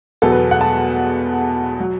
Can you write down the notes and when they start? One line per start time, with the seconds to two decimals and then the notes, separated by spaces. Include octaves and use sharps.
0.22 E2 B2 F#3 A4
0.32 B4
0.51 F#5
0.61 A5
1.80 F#3